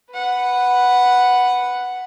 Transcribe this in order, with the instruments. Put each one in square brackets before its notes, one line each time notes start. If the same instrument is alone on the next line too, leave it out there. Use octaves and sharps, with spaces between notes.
[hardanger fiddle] B4 F#5